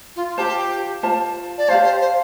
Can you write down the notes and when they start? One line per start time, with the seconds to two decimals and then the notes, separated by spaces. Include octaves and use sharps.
0.16 F4
0.37 F4 G4 C5 A5
1.03 F4 C5 A5
1.58 D5
1.68 G4 C5 F5 A5
1.85 C5
2.00 C5